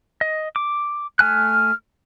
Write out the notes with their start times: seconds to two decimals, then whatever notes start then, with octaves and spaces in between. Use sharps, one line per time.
0.21 D#5
0.56 D6
1.19 A3 G#5 F6 F#6